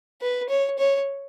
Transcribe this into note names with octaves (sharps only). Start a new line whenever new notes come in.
B4
C#5
C#5